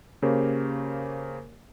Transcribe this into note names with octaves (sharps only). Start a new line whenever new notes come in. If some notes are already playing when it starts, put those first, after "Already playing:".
C#3 A#3 G4 A#4 C5 C#5